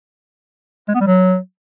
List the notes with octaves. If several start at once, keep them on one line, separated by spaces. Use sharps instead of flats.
G#3
B3
G3
F#3